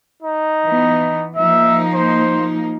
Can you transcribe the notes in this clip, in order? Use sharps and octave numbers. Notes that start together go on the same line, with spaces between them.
D#4
E3 B3
F3 A#3 D#4 E5
C5